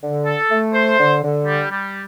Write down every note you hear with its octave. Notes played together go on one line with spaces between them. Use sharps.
D3
A4
A3
C5
D3
D3
G3
G3